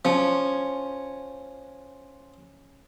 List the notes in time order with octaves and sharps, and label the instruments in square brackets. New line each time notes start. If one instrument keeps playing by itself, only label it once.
[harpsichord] F3 [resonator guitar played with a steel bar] C#4